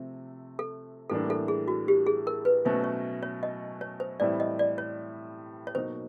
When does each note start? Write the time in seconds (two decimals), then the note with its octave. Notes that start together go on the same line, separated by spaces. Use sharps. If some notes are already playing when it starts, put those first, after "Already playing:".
Already playing: C3 F3 A3 C4
0.59 A4
1.09 A2 E3 G3 A#3 D4 A4
1.30 A4
1.48 G#4
1.68 F#4
1.88 G4
2.07 G#4
2.27 A#4
2.45 B4
2.65 B2 F#3 A3 C#4 F#4 C5
2.84 C#5
3.23 C#5
3.43 D#5
3.81 C#5
4.00 C5
4.20 A2 E3 G3 C4 E4 D5
4.40 D#5
4.59 D5
4.78 C#5
5.67 C#5
5.75 B2 F#3 A#3 D#4 F#4 C5